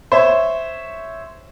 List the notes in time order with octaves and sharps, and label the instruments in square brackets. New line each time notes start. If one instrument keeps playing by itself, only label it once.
[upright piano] C5 C#5 E5